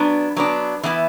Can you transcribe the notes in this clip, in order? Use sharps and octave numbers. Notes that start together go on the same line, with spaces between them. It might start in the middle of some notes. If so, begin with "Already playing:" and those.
Already playing: F#3 B3 D4
F#3 B3 D4
E3 B3 E4